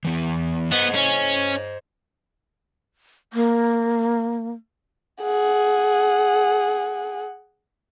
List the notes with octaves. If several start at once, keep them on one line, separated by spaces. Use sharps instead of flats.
E3 B3
B3 C5 D#5
C#4
A#3
G#4 F#5